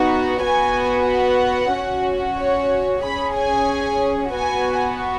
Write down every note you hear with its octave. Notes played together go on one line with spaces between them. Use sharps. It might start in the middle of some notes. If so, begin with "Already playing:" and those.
Already playing: B3 D#4 F#4
B3 F#4 G#5
F#5
C#4 F#4
C#5
C#4 G#4 B5
G#5
B3 F#4 G#5